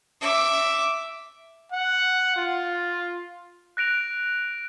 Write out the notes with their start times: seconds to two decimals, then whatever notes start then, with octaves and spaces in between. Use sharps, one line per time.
0.21 E5 D6
1.72 F#5
2.36 F4
3.77 F#6 A#6 D7 F7